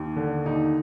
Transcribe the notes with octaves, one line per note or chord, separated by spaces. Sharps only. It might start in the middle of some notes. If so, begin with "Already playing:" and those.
Already playing: D#2
D3
D#2 D#4